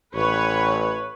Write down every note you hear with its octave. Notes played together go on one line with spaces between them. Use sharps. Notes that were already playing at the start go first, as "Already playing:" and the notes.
A1 B4 C#5